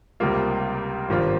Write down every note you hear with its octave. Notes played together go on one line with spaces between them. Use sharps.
C#2 C3 G3 A#3 F4
G#1 G2 F3 A#3 F4